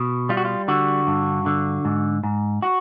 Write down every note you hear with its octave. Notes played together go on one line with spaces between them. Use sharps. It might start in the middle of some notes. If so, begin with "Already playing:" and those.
Already playing: B2
G3 F4
F#4
F4
D3 F#4
G2
D3
G#2
G#2
F#4